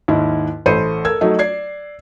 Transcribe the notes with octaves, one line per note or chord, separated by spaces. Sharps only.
D#2 G#2 E4
A1 A3 C5 B5 C#7 D#7
A4 A#4 E6 G#6
F#3 A3 D#4
D5 G#6 C7